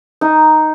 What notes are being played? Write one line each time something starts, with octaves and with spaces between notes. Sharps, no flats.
D#4